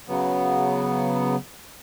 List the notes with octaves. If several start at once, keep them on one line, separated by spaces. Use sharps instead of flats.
C#3 F#3 B3